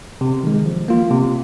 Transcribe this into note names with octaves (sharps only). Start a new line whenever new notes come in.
C3
D#3 G#3
F3
A#3 F4
C3